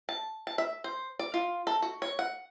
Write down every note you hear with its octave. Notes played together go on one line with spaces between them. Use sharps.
A5
A5
E5
C5
D5
F4
A4
F#4
C#5
F#5